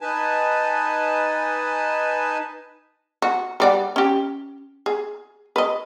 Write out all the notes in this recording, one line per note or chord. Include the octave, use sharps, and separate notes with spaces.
D#4 B4 G#5 A5
F#4
G3 D5 F#5
C#4 G4
G#4
B4 D#5